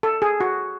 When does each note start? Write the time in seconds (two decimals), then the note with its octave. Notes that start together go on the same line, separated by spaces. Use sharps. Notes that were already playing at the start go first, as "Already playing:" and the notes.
0.03 A4
0.22 G#4
0.40 F#4